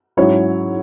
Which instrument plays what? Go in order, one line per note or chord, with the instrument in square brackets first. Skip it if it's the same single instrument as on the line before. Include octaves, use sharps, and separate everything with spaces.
[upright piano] G#2 F#3 C#4 E4 C#5